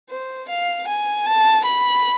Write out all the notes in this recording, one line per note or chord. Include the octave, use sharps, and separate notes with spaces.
C5
F5
G#5
A5
B5